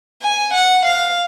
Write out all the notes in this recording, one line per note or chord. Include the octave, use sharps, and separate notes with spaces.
G#5
F#5
F5